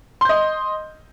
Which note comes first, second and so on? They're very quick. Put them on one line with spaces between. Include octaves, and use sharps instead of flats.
C6 G6 D#5